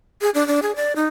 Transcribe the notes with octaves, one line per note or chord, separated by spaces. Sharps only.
G#4
D4
D4
G#4
D5
D#4